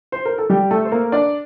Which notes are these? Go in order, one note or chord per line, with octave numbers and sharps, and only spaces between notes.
C5
A#4
A4
G3 G4
A3 A4
C5
A#3 A#4
D4 D5